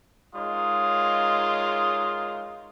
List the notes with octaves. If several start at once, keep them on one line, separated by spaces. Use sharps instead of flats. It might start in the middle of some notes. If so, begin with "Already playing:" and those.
G#3 D#4 F4 A#4 C#5 D#6